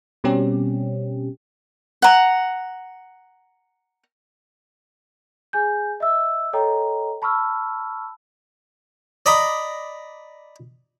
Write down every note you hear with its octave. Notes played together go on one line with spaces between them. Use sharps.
B2 G3 C4 C#4 G4
F#5 A#5
G#4 G#5 G6
D#5 E5 E6
A4 C#5 D#5 G5 A#5
A5 B5 C#6 E6 F6
D5 D#5 A#5 B5 D#6